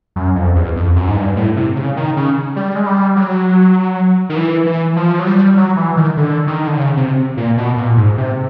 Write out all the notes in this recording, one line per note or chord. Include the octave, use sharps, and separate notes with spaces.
F#2
F2
E2
F2
F#2
G#2
G2
A2
C3
C#3
D#3
C#3
G3
G#3
G3
F#3
D#3
E3
E3
F3
F#3
G3
F#3
E3
D#3
D3
D#3
D3
C#3
C3
A#2
B2
A#2
G#2
C3